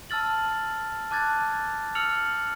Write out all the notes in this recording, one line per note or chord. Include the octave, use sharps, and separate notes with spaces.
A5 E6 F6 A6 F#7
A5 D6 F#6 G#6 A6
E6 F6 C#7 F7 F#7